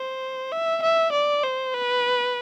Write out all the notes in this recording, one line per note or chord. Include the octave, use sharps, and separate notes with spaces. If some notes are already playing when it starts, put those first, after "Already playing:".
Already playing: C5
E5
E5
D5
C5
B4